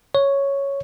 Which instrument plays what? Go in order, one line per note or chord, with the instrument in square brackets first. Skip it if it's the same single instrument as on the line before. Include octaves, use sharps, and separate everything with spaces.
[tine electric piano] C#5